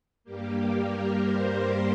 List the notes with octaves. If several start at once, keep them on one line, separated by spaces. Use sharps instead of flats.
G2 G3 A#3 G4
A#4
C5
C6